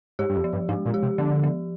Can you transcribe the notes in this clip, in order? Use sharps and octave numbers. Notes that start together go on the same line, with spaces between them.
G#2 G4
G2
F2
F3
G2
G#2 G#3
A#2
G4
C3
D3 F3
F3